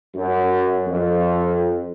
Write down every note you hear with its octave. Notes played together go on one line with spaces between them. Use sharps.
F#2
F2